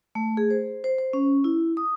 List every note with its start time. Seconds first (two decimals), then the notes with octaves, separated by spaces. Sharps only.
0.15 A3
0.37 G#4
0.50 C5
0.84 C5
0.98 C5
1.13 C#4
1.44 E4
1.77 D#6